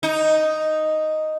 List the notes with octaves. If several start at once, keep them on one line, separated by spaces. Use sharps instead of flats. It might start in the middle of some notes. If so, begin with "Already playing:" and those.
D#4